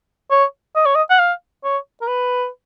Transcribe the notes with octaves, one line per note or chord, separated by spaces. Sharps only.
C#5
D#5
C#5
D#5
F#5
F5
C#5
A#4
B4